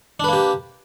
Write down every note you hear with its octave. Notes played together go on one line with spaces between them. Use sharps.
A#3 D4 G4 B4